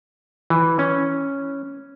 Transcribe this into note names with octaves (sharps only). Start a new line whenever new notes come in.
E3
C#4